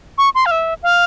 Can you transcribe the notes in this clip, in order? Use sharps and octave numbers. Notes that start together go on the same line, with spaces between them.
C#6
C6
F5
E5
F5